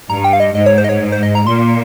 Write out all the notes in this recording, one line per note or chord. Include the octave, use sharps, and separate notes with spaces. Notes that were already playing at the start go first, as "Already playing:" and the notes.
G2 A#5
G5
F5
D#5
G#2 D#5
C#5
C5
D#5
C#5
C5
D#5
A#5
A#2 C6